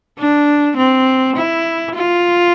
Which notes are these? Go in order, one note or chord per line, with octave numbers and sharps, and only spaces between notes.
D4
C4
E4
F4